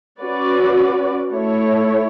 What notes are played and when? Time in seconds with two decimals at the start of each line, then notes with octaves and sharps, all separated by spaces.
0.20 C#4 F#4 B4 D5
1.32 A3 E4 A4 C#5